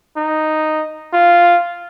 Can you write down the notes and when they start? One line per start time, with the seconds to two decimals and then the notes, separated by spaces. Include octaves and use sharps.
0.17 D#4
1.13 F4